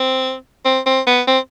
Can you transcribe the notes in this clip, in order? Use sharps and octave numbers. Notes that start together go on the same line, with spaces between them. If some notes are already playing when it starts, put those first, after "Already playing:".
Already playing: C4
C4
C4
B3
C4